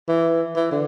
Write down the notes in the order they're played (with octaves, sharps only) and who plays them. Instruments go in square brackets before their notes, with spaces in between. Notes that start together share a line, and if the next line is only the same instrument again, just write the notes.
[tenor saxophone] E3
E3
D3